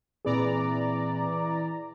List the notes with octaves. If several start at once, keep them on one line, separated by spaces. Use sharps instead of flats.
A#2 E3 C4 G#4 D5 A#5